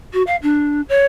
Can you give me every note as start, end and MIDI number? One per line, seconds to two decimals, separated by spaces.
0.13 0.23 66
0.27 0.36 77
0.42 0.81 62
0.89 1.05 73